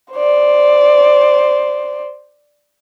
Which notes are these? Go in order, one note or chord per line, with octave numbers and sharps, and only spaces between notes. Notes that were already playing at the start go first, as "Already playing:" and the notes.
C5 D5